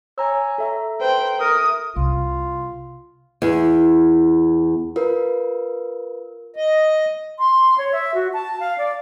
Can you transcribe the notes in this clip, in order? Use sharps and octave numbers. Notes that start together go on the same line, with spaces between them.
C#5 G#5 A#5 E6
A4 E5 A#5
B4 C5 G5
A#4 D#6
C2 F4
E2
F4 A#4 B4
D#5
C6
C#5
E5
F#4
A5
F5
D5